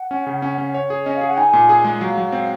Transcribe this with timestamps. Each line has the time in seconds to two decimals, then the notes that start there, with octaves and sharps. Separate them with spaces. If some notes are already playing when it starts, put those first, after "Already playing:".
Already playing: F#5
0.11 C#4
0.27 C#3
0.42 C#4
0.58 C#4
0.74 C#5
0.90 G#4
1.05 C#4 D#5
1.16 F5
1.21 G#4
1.27 F#5
1.37 D#4 G#5
1.53 A#2
1.69 G#4
1.85 G#3
2.00 F#3 F5
2.17 F#3
2.32 C4